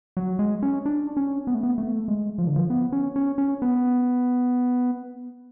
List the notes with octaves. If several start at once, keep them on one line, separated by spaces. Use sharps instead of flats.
F#3
G#3
C#4
D4
C#4
B3
A3
B3
A3
G#3
F3
D3
F3
B3
C#4
C#4
C#4
B3